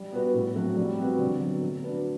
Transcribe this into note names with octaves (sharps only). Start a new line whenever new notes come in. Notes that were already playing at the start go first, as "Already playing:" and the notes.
Already playing: G3
B3 F#4 B4
A2
F#3 A3 C4 F#4
G3
C4 F#4 B4
D3
F#3 B3 F#4
A3
D4 F#4 B4